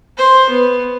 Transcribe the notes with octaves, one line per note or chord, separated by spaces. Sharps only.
C5
B3